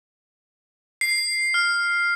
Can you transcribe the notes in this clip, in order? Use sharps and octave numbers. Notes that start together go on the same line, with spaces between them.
C7
F6